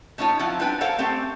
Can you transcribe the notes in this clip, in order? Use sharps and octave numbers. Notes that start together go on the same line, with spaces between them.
A3 C#4 D#4 F4 C#5
F3 F#3 C4 E4 F4
G3 B3 D4 B4 G5 G#5
A4 A#4 C5 C#5 F5 F#5
A3 C4 C#4 G4